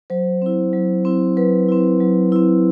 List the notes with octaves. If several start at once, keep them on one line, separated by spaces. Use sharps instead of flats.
F#3 C5
C4 E4
F#3
C4 E4
F#3 B4
C4 E4
F#3
C4 E4